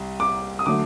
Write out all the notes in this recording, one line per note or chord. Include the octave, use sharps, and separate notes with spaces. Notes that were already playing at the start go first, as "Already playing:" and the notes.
Already playing: C2 G3
D6
D#6
D3 F#3 A3 D6